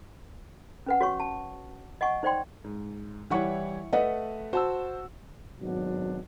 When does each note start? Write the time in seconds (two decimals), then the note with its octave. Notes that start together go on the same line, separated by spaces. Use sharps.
0.86 C#4 B4 F#5
1.01 F#4 C#5 C#6
1.20 A5
2.01 D#5 F#5 G#5 C#6
2.23 D#4 C5 D5 G5 C6
2.64 G#2
3.30 E3 G3 E4 C#5 F#5 C#6
3.93 A3 B4 D#5 F#5
4.53 F#4 C5 A5 E6
5.61 G#1 B2 F#3 D4